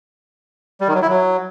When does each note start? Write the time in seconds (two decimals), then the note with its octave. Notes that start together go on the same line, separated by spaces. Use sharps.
0.81 G3
0.88 D#3
0.95 F#3
1.02 E4
1.09 F#3